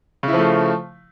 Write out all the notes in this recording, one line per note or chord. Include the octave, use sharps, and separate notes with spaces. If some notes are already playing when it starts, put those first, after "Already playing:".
C#3 F3 A3 E4